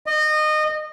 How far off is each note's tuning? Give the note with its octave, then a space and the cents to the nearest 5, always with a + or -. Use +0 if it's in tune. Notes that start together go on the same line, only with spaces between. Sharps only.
D#5 -25